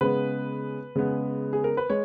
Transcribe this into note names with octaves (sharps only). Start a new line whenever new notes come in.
C#3 G#3 B3 B4
C#3 G#3 B3
G#4
A#4
B4
G#3 C#5